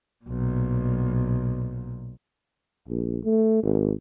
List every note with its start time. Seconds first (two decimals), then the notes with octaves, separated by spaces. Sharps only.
0.25 B1 A#2
2.88 A#1
3.24 A3
3.63 G#1